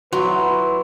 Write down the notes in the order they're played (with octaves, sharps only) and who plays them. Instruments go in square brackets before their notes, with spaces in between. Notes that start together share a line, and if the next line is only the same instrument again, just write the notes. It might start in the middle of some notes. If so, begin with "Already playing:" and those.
[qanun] F#3 [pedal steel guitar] E4 F#5 C6 [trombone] B4